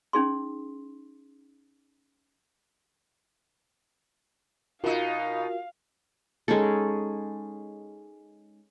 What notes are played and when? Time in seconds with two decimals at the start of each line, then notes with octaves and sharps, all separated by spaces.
0.13 C#4 D#4 G#4 C6
4.84 B2 D#4 F4 F#4 A#4 F5
6.48 G#3 C#4 D#4 A4